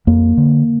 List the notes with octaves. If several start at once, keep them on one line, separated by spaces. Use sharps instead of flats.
F2 A#3
D3